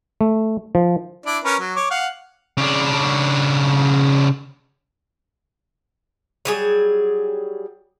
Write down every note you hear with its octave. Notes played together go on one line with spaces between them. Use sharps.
A3
F3
D4 E4 D5
C#4 A#4 B4
F#3
C#5 D6
F5 F#5
C#3 D4
F#3 G3 G#4